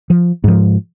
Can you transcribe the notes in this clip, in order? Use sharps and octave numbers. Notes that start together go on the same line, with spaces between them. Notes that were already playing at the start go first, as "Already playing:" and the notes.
F3
G#2 F3